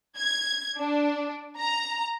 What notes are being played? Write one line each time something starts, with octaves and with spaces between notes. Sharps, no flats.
G#6
D4
A#5